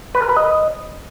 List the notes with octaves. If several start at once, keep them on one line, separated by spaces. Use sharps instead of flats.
B4
A#4
B4
D#5